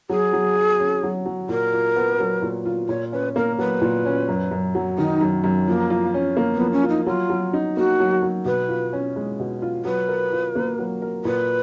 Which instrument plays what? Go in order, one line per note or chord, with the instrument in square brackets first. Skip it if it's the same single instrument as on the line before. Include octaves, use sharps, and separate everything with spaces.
[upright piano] F#3 [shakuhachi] G#4
[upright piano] F#3
F#4
C#4
F#3
F#3
[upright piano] A#2 [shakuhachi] A#4
[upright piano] F4
B3
F#3
A#2
F4
[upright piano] A#2 [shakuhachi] C#5
[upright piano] C#4 [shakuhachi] B4
[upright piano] A#3 [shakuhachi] A#4
[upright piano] F#3 [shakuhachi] B4
[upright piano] A#2
C#4
F#2
F#2
F#3
[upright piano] D#3 [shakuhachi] D#4
[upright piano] F#2
F#2
[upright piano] F3 [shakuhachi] A#3
[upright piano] F4
C#4
A#3
[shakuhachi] B3
[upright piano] F3
[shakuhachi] C#4
[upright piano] F4
[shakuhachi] D#4
[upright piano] F#3 [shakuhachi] F4
[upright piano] F#3
D#4
[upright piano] A#3 [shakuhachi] F#4
[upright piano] F#3
F#3
[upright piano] B2 [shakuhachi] B4
[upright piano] F4
C#4
G#3
B2
F4
[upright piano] F#3 [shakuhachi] B4
[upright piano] A#4
F4
A#3
F#3
A#4
[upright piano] A#2 [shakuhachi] B4